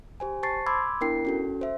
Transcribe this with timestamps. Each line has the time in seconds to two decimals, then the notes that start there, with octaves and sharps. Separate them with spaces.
0.20 G4 C5 G#5
0.43 C5 A5 C#6 A6 C7
0.67 B5 C6 D6 E6 G#6
1.01 B3 D4 E4 A#4 G5 C7
1.25 C#4 F#4 A4
1.61 C5 E5